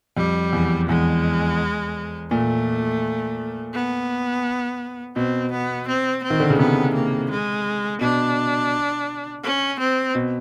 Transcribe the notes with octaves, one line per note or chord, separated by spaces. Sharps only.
F2 G3
E2
E2 G#3
A#2 A3
B3
B2 C4
B3
C4
C4
D#3
D3
C#3
C3 B3
A#3
G#3
B2 D4
C#4
C4
B2